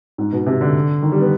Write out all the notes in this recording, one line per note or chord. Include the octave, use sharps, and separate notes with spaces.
G#2
B2
C3
D3
D#3
G3
B3